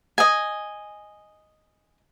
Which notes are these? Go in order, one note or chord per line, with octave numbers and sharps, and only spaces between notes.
D#5 G#5